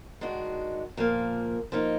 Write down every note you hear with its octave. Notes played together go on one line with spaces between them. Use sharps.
D#3 G#3 D4 F#4
A#2 F3 A#3
F3 A#3 D#4